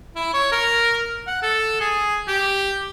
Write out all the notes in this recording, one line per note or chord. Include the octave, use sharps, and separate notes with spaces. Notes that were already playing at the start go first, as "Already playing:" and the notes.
E4
C#5
A#4
F#5
A4
G#4
G4